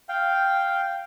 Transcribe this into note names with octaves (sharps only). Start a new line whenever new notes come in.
F5 G5